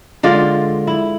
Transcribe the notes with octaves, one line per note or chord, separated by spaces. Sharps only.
D3 G#3 F4 D5
E4